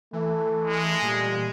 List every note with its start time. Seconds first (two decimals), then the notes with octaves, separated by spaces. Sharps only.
0.13 E3 A3
0.65 G#3
1.02 A#2 G3